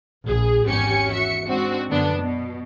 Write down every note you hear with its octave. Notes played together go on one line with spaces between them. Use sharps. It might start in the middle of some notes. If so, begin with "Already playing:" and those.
A#1 G#4
G#1 E2 C#4 G4 G#5 C#7
F#4 E5 C#7
G#2 C4 D4 F#4
F#2 D3 B3 D4
B2